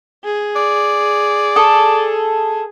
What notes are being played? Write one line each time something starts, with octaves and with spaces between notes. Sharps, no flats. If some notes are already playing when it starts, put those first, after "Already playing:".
G#4
D5
A4 D#6